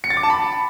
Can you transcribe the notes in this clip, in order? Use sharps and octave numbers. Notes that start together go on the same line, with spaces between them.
C#7
A6
D6
A5
B5